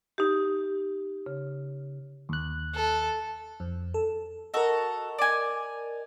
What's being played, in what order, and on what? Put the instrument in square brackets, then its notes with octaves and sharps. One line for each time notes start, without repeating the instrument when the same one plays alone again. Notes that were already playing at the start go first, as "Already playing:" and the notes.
[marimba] D#4 G4
C#3
[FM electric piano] D#2 F#6
[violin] A4
[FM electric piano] F2
A4
[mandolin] F#4 A4 [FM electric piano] A#4 D#5
[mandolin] D5 G#5